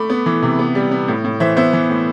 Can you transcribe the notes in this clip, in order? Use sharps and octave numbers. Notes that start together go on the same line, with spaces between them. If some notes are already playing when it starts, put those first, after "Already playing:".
Already playing: A3 B5 D6
B3
E3
C3
B3
G3
B3
A2
A2
E3 C5 E5
B3 C5 E5
E3
A2